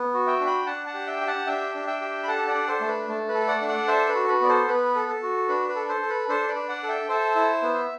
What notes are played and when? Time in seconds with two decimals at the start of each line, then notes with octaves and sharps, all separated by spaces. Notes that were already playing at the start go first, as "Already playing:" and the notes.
Already playing: B3
0.14 F#4
0.27 E5 G5
0.41 D4
0.46 G5 B5
0.66 D4 F#5 A5
0.86 F#5 A5
0.94 G4
1.06 E5 G5
1.21 G4
1.27 F#5 A5
1.47 D4 E5 G5
1.75 D4
1.87 E5 G5
2.01 G4
2.23 B5
2.28 A4 F#5 A5
2.48 D5 F#5
2.55 D4
2.67 A4 C5
2.81 A3
2.88 B4
3.08 A3
3.29 B4
3.34 A4
3.48 D5 F#5
3.62 D4
3.68 D5 F#5
3.88 A4 C5 E5
4.09 B4
4.15 F#4
4.28 B4
4.41 B3 D5
4.48 A4 C5
4.68 B3 B4
4.95 A4
5.08 A4
5.23 F#4
5.48 D4 B4
5.69 B4
5.76 A4
5.88 A4 C5
6.02 A4
6.10 B4
6.29 D4 A4 C5
6.49 B4 D5
6.55 D4
6.69 D5 F#5
6.83 A4
6.89 E5 G5
7.09 A4 C5 E5
7.36 E4
7.63 B3